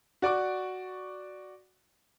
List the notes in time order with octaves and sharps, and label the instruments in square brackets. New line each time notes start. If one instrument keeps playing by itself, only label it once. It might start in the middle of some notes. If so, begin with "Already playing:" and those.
[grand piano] F#4 D5 C#6 D6